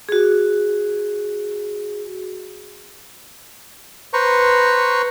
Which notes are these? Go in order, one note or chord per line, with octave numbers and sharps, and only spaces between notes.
F#4 G#4
B4 C5 A#5 C#6